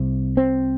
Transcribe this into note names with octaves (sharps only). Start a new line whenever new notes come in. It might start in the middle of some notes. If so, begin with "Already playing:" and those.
Already playing: C2 C3
C4